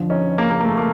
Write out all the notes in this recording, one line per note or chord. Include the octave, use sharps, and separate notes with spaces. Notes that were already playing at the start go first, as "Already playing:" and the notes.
Already playing: F2 D3 F3
C#4 D#4
A#3
A#3
A#3
A3
A#3